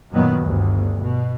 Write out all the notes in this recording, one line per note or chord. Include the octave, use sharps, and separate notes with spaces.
F#2 A#2 D#3 F#3 B3
G1 D2
B2